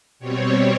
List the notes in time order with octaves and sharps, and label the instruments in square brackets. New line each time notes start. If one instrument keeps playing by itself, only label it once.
[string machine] B2 G3 C4 C#5